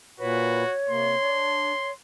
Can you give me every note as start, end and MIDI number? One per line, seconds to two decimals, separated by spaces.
0.20 0.63 46
0.20 0.75 66
0.20 0.63 71
0.20 1.92 73
0.89 1.15 48
0.89 1.15 58
0.89 1.94 84
1.21 1.72 62